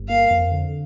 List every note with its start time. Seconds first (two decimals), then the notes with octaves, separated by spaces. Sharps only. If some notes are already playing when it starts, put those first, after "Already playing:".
Already playing: G1
0.09 A#3 F5
0.31 F2
0.51 D3